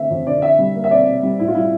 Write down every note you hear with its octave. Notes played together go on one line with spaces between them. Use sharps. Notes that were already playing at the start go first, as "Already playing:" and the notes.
Already playing: D3 A3 C4 E5
F2
D3 D5
C3 E5
G3
A#3
E5
C3 D5
C3
G3
A2 E4
F4
G3 E4